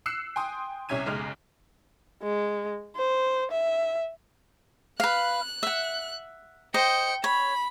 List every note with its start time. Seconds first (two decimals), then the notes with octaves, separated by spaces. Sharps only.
0.06 E6 F#6 C7 C#7 E7
0.36 G5 G#5 C6 D#6
0.89 C2 C3 C#4 E5 G#6 D#7
1.06 F#1 B1 G#3 F6
2.23 G#3
2.96 C5
3.52 E5
5.00 B4 F5 F#6
5.63 E5 F#5
6.74 C5 D#5 G5 C#7
7.24 C#5 B5